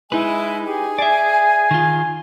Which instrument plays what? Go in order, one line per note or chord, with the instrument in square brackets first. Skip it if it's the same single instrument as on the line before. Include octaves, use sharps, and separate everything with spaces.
[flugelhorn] G#3 [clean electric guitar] D#4 B4 [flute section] E4 G#5
[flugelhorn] G4 [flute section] G#4
[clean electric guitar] D5 E5 [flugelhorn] G#5
[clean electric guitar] D#3 F4